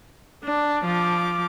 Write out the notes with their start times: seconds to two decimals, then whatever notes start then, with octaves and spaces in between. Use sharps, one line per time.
0.44 D4
0.85 F3 D6